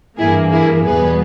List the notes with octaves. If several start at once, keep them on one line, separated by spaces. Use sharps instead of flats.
G2 E3 A#3 E4 G#4
E4 G#4
E2 B2 G3 B3 G#4 B4